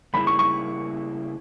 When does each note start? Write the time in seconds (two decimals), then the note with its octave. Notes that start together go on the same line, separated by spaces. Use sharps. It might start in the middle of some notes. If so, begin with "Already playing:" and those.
0.14 C#3 G3 A#3 E4 G#4 B5
0.27 C#6
0.39 C#6